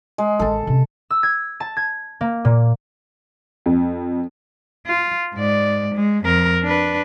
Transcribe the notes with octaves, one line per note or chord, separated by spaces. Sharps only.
G#3
A1 D#3 A4
C3 C#4
E6
G#6
A5
G#6
A#3
A#2
F2
F4
G#2 D5
G#3
F2 A#4
D4 B4